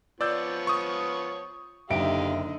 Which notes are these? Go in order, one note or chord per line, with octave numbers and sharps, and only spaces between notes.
F3 B3 C#5 D5 E6 G6
C#6 D#6
F#1 D3 D#4 G4 E5 F5 D7